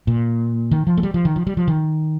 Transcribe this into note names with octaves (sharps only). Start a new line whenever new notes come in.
A#2
D#3
F3
A3
G3
F3
D#3
F3
G3
F3
D#3